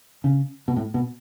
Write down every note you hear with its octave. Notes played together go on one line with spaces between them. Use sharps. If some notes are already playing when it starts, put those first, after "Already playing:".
C#3
B2
A2
B2